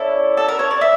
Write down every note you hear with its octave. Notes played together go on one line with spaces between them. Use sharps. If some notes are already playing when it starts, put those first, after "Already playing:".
Already playing: C#4 E4 A4 D5
A4
A#4
C#5
D5
E5